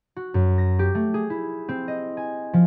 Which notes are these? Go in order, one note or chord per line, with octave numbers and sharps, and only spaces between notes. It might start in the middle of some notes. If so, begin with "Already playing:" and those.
F#4
F#2
A#6
G4
A3
G#4
E4
C4
D#5
G#5
F3